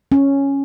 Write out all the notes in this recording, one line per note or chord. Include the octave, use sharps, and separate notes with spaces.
C#4